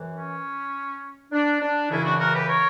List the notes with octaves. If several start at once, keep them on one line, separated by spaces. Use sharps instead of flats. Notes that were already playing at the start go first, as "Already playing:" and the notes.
Already playing: F#2 E3
C#4
D4
D4
F#2 C#3 E3 C#4 E4
D4 F#4
F#4 A#4
G4 B4
A#4 C#5